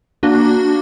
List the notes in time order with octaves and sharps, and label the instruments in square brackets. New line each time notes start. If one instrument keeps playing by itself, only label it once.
[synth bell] A#3 D4 F#4